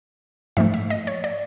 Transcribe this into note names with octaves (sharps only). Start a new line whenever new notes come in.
G#2 F3 A3 E5
E5
D#5
C#5
D5